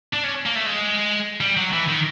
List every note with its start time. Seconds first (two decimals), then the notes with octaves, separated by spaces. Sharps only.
0.13 D4
0.24 C#4
0.46 A#3
0.55 A3
0.66 G#3
1.41 G3
1.57 F#3
1.73 E3
1.88 D#3